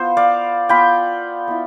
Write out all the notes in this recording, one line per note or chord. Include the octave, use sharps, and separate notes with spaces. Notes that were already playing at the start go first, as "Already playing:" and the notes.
Already playing: B3 F4 C5
D5 F5
B3 F4 G5 B5
B3 E4